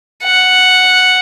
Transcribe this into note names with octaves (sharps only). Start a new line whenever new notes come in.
F#5